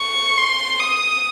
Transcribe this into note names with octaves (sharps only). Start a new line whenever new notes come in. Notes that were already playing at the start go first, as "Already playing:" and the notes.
Already playing: C#6
C6
D#6